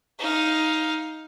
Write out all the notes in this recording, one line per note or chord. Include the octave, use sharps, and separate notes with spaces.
D#4 F5